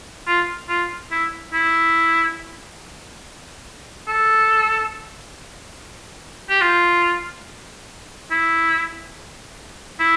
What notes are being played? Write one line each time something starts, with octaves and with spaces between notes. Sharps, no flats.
F4
F4
E4
E4
A4
G4
F4
E4
E4